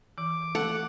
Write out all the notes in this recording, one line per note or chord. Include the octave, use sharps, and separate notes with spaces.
E3 D6
A3 F#5